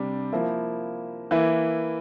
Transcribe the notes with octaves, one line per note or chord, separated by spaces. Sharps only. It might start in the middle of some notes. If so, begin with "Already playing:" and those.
Already playing: C3 G3 D4
F3 A#3 E4
E3 A#3 E4